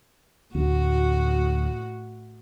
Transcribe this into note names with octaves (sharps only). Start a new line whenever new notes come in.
D2 A2 F#4